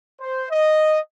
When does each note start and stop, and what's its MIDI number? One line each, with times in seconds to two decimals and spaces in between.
0.20 0.46 72
0.51 0.98 75